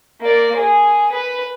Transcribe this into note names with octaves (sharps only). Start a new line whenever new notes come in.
A#3 D5
G#4
B4